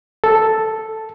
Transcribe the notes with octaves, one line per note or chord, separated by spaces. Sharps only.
A4